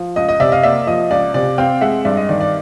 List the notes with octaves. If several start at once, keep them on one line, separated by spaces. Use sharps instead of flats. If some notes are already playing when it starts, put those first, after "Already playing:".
Already playing: F3
C#2 D#5
D#5
C3 D5 E5
D#5 F5
A#3 D5 E5
F3 D#5
C#2 D5
C3 D5
C4 F5 G5
G#3 E5 F#5
G2 D5 E5
D#5
D#3 D5
D5